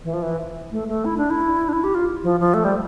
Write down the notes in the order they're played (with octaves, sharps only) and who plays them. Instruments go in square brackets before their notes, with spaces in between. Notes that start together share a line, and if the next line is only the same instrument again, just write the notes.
[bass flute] E3
F3
E3
A3
A3
E4
D4
E4
D4
E4
G4
F4
F3
F3
A3
G3